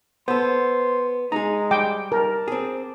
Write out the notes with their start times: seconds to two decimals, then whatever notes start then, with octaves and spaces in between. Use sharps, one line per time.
0.28 B3 A4 C5 C6
1.32 G#3 D#4 G#4 A#5
1.71 G3 G5 D6
2.12 A#4 A5
2.48 C4 G#4